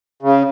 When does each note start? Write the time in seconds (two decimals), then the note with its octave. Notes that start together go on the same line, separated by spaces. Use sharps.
0.22 C#3